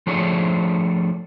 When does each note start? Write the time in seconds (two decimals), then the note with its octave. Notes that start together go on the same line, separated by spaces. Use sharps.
0.07 F3 A3 D4 G#4 C#5